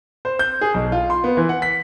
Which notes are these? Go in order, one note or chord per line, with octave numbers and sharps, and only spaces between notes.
C5
G6
G#4
B1
F4
C6
B3
E3
F#5
B6